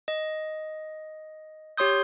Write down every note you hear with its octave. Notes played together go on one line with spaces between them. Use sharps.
D#5
G4 C#5 C6 D#6 G6